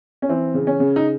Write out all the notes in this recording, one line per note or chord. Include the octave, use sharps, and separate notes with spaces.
C#4
E3 C4
C#3
C#4
C#3
D#4